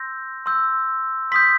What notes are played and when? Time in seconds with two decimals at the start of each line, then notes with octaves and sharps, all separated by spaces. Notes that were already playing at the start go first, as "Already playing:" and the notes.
Already playing: C6 E6 G6 A#6
0.46 C6 E6 G6
1.32 C6 D#6 G6 B6